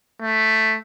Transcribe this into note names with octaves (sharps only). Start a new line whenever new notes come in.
A3